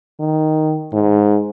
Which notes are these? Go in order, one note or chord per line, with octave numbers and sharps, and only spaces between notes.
D#3
G#2